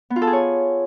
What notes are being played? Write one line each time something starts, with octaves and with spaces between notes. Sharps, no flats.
B3
F4
A4
G#4
C#5